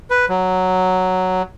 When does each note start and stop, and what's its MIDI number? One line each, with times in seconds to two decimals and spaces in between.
0.10 0.26 71
0.29 1.42 54